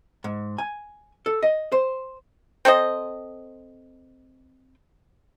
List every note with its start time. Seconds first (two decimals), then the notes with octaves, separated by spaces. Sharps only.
0.24 G#2
0.58 G#5
1.26 A4
1.43 D#5
1.72 C5
2.65 C4 A4 C5 D#5